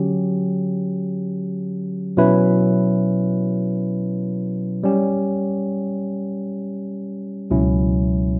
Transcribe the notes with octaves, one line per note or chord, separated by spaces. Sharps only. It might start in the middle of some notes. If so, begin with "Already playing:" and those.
Already playing: D3 F#3 C#4 G4
B2 F#3 C#4 E4 B4
G3 C#4 G4
C#2 B2 F#3 C#4 E4